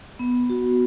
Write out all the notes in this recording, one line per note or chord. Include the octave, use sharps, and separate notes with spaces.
B3
F#4